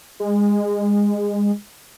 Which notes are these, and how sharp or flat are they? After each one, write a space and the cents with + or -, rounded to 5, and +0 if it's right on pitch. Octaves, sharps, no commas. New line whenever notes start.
G#3 -20